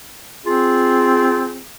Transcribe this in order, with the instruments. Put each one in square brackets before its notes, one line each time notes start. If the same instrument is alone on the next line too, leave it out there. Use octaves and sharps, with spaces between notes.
[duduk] C4 [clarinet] F4 [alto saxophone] G#4